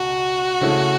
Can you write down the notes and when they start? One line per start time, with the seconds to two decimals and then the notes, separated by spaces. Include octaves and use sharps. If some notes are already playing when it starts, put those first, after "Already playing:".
Already playing: C#2 B2 F#4
0.61 C#3 A3 C#4 E4